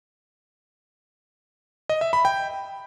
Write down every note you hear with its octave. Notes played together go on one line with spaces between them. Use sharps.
D#5
E5
B5
G5